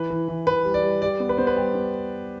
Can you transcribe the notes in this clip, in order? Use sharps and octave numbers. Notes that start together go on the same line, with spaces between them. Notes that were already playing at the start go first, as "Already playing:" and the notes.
Already playing: E3 B4
E3
E3
E3 B4
G3
D5
G3
G3 D5
B3
B4
B3 C5
B4
G3 G4
B3